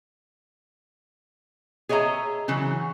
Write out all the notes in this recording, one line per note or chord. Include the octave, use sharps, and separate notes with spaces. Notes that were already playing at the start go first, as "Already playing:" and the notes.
G#4 C#5 D#5 E5 A#5
C#3 E3 F#3